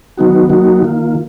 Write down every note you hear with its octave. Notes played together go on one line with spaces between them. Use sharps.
D#3 F#3 B3 D#4 F#4
F#3 A#3 D#4 F#4
D#3 A#3 F4